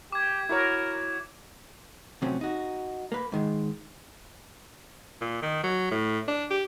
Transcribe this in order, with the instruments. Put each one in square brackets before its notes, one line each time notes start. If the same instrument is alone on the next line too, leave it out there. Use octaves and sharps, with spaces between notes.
[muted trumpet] G4 [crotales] D6 G#6
[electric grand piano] E4 F#4 C#5 [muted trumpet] A#4
[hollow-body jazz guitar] A2 C3 F3 F#3 C4 C#4
D#4 F#4
A#3 B4
G#2 D#3 G#3
[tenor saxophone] A#2
D#3
F#3
A2
D4
G4